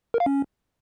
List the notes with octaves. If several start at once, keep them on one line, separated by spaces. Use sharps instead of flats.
A#4
F5
C#4